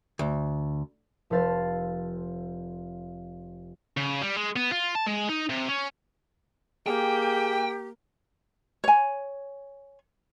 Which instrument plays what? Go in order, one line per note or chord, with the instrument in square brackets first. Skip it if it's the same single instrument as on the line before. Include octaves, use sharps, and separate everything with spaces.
[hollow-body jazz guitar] D2
[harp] F1 A4 B4 C5 F5 A6
[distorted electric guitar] C#3
G3
G#3
B3
F4
A5
G#3
D#4
C3
C#4
[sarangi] A#3 [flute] G4 [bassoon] G#4 [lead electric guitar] G5
[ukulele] C#5 G#5